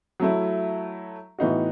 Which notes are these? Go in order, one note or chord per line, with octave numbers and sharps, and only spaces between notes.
F#3 A3 E4
A2 E3 B3 D#4 F#4